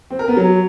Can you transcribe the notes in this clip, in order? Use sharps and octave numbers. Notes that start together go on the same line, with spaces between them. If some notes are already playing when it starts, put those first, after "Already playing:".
C4
A#4
B3
F#3